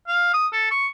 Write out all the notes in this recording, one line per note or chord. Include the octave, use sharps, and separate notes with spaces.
F5
D#6
A4
C#6